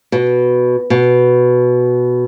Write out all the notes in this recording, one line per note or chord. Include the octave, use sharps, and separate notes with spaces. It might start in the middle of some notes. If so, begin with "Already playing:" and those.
B2
B2